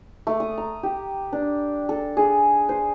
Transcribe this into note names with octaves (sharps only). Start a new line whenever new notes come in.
A3
D#6
A#5
G4
D4
A4
G#4
C5